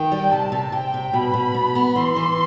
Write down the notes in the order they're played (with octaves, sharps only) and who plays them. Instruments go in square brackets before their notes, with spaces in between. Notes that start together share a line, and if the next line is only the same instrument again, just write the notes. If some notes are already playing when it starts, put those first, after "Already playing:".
Already playing: [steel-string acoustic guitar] D#3 [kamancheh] G5
[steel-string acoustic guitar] G3
[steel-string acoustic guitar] C3 [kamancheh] A5
[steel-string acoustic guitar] C3
[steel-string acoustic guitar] C3 [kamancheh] G5
[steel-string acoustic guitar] C3
[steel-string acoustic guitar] B2 [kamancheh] B5
[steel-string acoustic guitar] B2
B2
B3
[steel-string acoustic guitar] E3 [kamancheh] C6
[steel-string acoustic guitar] E3